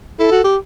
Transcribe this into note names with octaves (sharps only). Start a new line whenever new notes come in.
E4 A4
F#4
G4